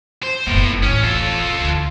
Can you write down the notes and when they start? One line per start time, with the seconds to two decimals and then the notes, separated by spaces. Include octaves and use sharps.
0.23 C5
0.47 F#1 A2 B3
0.83 D1 A1 C#4
1.03 F4 A4
1.42 B1
1.60 D2